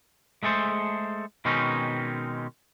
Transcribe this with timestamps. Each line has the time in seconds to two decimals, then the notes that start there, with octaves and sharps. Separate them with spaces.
0.43 G#3 A3 G#4 A4 C5
1.45 B2 D#3 G#3 C4 C#4 D#4